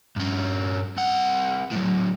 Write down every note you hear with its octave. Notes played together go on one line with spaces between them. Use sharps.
G2 C#4
C2 F#5
A2 F#3